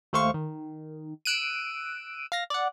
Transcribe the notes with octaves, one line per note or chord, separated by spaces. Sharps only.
D#2 A3 C5 F5 C#6
D#3
E6 F#6 D7 D#7
F5 A#6
D5 F#5